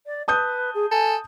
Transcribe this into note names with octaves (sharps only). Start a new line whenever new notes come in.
D5
B4 A5 D#6 G6
G#4
A4 G#5